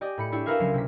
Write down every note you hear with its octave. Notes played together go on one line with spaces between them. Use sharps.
G4 D5 D#5 G#5
A2 B5 C#7
D4 E4 G4 G#4 C#5
F#4 A#4 B4 E5 F5 G#5
C#2 F#3 C7
C3 B6